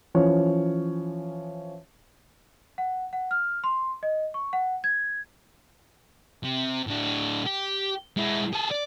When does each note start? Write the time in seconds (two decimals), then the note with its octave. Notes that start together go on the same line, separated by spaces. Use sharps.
0.15 E3 F3 C#4 C#5
2.78 F#5
3.13 F#5
3.31 F6
3.64 C6
4.03 D#5
4.34 C#6
4.53 F#5
4.84 G#6
6.44 C3
6.87 A2 D4
7.46 G4
8.17 G#3 E4
8.53 G#4 A4
8.71 D5